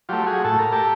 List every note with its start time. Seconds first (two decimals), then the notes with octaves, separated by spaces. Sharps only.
0.09 F#3 A3 F4 G4
0.26 F#4 G#4
0.44 A2 A4
0.59 A#4
0.72 G4 A4